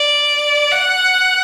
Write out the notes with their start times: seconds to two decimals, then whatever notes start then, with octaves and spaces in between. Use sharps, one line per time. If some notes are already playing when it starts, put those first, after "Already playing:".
Already playing: D5
0.71 F#5